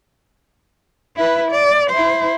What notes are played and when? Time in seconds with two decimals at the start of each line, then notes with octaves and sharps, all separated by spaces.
1.16 E4 B4
1.51 D5
1.91 E4 C5